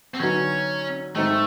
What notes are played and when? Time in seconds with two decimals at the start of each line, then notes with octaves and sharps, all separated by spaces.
0.14 C4
0.20 D3 F#3 B3 C#4 D#4 F#4
1.15 G#2 D#3 G#3 A3 C4 D#4